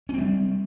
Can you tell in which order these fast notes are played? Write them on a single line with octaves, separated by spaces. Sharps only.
C#4 C4 G3